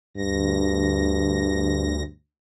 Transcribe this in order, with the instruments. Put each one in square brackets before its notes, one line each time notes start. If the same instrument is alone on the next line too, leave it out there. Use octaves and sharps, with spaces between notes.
[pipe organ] D2 A#6 [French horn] G2